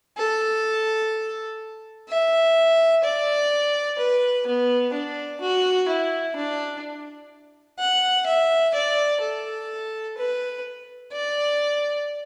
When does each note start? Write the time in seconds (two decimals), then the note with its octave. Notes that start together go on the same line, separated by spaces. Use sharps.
0.18 A4
2.09 E5
3.04 D5
3.99 B4
4.47 B3
4.94 D4
5.41 F#4
5.88 E4
6.37 D4
7.79 F#5
8.27 E5
8.74 D5
9.21 A4
10.18 B4
11.13 D5